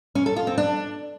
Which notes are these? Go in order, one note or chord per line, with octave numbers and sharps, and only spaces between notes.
C#4
A4
F4
C4
D4